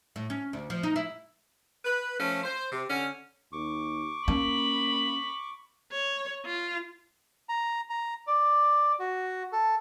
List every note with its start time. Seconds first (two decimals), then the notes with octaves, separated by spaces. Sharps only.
0.16 A2
0.30 C#4
0.53 D2
0.70 F3
0.83 D#4
0.96 E4
1.85 B4
2.19 F3 A3 C#4
2.44 C5
2.72 C3
2.89 D3 C#4
3.52 D#2 C#6 D6
4.28 A#3 C#4 B5
5.92 C#5
6.45 F4
7.49 A#5
7.90 A#5
8.27 D5
8.99 F#4
9.52 A4